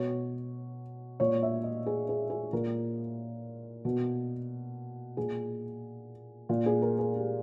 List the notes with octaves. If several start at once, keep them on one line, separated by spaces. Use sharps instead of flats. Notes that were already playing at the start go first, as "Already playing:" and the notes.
Already playing: B2 C#5
A#2 C#5
E5
D#5
G#4
G#4
G#4
A#2 A#4
B2
A#2 G#4
A#2
G#4
A#4
G#4
G4